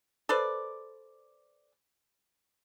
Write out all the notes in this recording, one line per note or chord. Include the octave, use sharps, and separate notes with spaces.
A4 B4 C5 D5